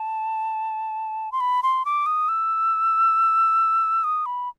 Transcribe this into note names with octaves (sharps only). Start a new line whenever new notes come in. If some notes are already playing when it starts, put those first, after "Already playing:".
Already playing: A5
C6
B5
C6
D6
D#6
E6
D#6
B5